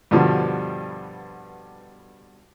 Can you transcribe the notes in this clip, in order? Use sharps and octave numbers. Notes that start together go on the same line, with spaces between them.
G2 B2 D3 F3 G3